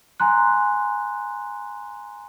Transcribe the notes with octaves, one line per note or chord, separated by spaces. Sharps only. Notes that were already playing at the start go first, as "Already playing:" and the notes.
G#5 A#5 C6 F#6